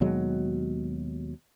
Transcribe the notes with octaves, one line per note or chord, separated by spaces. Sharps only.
D#2 B2 F#3 G#3